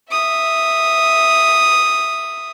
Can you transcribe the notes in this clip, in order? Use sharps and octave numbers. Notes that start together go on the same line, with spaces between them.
E5 D#6